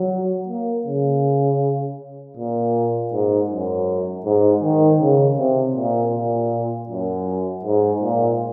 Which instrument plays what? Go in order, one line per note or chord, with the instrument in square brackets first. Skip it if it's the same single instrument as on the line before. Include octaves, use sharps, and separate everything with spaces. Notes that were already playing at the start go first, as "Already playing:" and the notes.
Already playing: [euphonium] F#3
A#3
C#3
A#2
G#2
F#2
G#2
D#3
C#3
C3
A#2
A#2
F#2
G#2
A#2